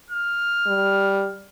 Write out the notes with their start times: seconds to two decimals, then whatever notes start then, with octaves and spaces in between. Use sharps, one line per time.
0.10 F6
0.67 G3